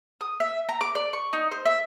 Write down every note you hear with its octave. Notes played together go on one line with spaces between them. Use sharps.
D#6
E5
A#5
D6
D5
C#6
D#4
C5
E5